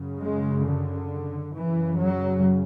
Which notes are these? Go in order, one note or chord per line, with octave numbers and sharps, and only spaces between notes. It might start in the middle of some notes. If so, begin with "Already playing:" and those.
Already playing: F#2 C#3
G#3
D3
F#2 C#3 E3
F#3